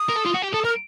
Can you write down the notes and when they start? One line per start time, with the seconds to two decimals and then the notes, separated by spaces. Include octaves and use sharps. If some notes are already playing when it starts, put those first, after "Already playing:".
Already playing: D#6
0.09 A#4
0.17 A4
0.26 F4
0.34 F#4
0.42 G4
0.53 A4 D#6
0.64 A#4 F6